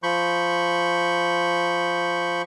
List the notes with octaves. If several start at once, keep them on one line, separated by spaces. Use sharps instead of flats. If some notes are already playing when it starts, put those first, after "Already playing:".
F3 B5 C#6 G6